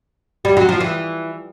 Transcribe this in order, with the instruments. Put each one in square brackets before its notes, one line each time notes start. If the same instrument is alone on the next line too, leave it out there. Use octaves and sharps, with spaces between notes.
[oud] G3
F#3
F3
E3